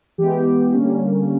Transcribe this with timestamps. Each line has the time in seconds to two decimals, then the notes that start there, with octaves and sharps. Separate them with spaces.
0.18 E3 G#3 B3 G4
0.74 D3 G3 A#3 C#4